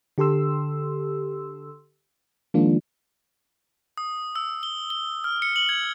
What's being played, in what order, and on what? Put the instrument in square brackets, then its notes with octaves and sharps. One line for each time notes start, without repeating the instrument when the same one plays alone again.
[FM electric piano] D3 G4 A4 C6 E6
D#3 F3 G#3 A#3 D4 F4
[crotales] D#6
E6
G7
G7
F6
C#7
F#7
G#6